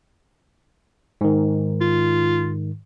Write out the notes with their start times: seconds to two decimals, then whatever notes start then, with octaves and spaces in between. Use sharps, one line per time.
1.21 G#2 D#3
1.81 F4